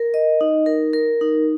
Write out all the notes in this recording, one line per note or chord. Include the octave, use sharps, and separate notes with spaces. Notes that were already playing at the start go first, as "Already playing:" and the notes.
Already playing: A#4
D#5
D#4
A#4
A#4
D#4